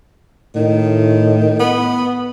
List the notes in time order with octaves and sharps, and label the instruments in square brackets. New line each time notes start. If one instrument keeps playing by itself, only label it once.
[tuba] A2 [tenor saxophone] D#3
[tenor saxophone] B3